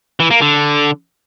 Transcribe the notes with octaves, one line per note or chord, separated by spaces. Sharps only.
E3
A#3
D3